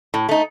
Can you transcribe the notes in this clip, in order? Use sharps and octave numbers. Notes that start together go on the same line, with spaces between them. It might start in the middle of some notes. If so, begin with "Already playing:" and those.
A2
A3 D#4